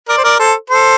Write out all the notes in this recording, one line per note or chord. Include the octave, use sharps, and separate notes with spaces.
A#4 D5
C5
A#4 D5
A4 C5
A4 C5